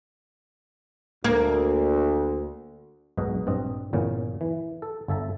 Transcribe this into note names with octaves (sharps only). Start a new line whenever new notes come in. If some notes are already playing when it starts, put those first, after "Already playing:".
D2 A#3
B1 G#2 B2 F#4 D#5
A#1 G2 C4 D#5
G1 E2 A#2 C#4
E3
A4
G1 A4 E5 A5 A#5